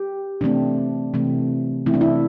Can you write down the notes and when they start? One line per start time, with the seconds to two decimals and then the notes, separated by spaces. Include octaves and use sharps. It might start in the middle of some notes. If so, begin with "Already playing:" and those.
Already playing: G4
0.41 C3 E3 A3 C4 D4
1.14 C3 E3 A3 C4
1.86 C3 E3 A3 C4 E4
1.94 D4
2.01 E4